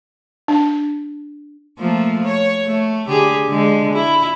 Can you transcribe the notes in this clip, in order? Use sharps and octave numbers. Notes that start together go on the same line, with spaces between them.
D4
F3 A3 A#3
C#5
A3
D3 G4 G#4
D3 G#3
E4